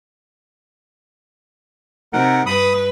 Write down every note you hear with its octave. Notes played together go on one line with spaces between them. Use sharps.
C3 D#4 A#4 F#5
G2 B4 B5 D#6